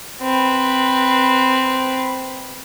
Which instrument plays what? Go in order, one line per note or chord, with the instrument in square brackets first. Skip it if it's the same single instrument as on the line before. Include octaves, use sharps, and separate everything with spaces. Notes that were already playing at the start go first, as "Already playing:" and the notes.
[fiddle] C4 B4